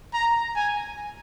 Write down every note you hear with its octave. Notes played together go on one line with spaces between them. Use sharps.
A#5
G#5